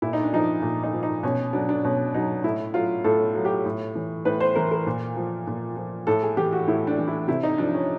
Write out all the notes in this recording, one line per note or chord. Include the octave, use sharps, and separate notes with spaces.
A#2 E4
D#4
D4
F3 D#4
A#2
D#4
F3
D#4
B2 C#4
F#3 D4
D4
B2 C#4
F#3 D#4
A2 E4
F#3 F4
A2 A4
F#3
G4
A2
E3
A2 B4
C5
E3 A#4
A#4
A#2
F3
A#2
F3
A2 A4
G#4
E3 G4
F#4
A2 E4
D4
E3
E4
C3 E4
D#4
F3 D4
C#4